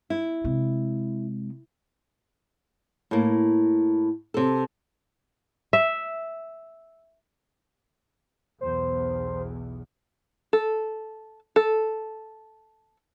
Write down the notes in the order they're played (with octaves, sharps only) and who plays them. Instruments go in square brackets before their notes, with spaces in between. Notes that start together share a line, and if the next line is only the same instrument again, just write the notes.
[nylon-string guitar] E4
[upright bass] C3 G#3
[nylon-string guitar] A2 A#3
C3 A4
[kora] E5
[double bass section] B1 E2 [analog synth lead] C5
[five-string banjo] A4
A4